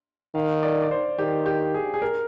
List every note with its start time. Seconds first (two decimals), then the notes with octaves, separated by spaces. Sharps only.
0.35 D#3 F5
0.63 D5
0.82 D5
0.91 C5
1.19 D#3 G4
1.46 G4
1.74 G#4
1.94 G#4
2.02 A#4